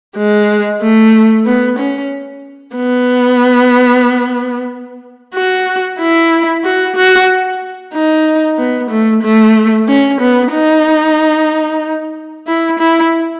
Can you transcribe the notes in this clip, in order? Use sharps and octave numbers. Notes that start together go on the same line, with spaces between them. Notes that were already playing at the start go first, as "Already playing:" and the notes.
G#3
A3
B3
C#4
B3
F#4
E4
F#4
F#4
D#4
B3
A3
A3
C#4
B3
D#4
E4
E4